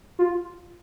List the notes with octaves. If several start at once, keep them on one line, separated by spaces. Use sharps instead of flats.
F4